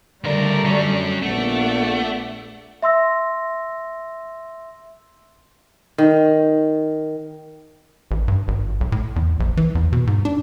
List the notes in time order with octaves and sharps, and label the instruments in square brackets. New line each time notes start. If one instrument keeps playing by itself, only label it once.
[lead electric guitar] C#2 A#4 [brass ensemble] D3 [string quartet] G3 A3 [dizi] D5
[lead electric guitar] F#3 C#4
[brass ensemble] A#1 [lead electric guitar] A3 [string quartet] B3 D5 [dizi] F#5
[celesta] E5 C6 E6 A#6
[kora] D#3
[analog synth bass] A1
G2
G#1
B1
A2
E2
A#1
E3
E2
B2
G#2
D4